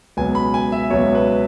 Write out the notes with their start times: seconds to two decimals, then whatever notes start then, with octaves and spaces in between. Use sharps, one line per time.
0.17 C#2 B2 F#3 B3 G#5
0.35 B5
0.54 G#5
0.72 E5
0.90 C#2 B2 F#3 B3 C#5
1.15 B4